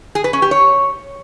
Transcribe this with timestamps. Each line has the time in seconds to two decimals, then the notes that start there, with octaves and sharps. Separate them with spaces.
0.15 G#4
0.24 B4
0.33 C#4
0.42 G4
0.51 C#5